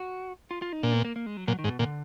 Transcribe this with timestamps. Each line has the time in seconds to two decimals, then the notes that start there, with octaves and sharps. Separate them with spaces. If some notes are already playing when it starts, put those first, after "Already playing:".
Already playing: F#4
0.51 F4
0.62 F4
0.72 D#4
0.83 A#2 D4
0.94 B3
1.05 A#3
1.16 A#3
1.26 G#3
1.37 F#3
1.47 A#2 F#3
1.59 D#3
1.64 G#2
1.69 B2
1.79 A#2 D3